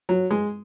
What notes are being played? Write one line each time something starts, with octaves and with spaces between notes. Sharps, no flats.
F#3
G#3